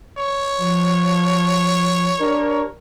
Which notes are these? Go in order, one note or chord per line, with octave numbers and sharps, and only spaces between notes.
C#5
F3
D4 G4 A#4